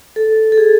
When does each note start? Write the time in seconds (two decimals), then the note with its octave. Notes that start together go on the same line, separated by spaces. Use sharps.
0.16 A4
0.52 A4
0.58 G#4